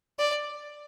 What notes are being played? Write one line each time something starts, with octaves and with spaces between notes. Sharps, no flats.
D5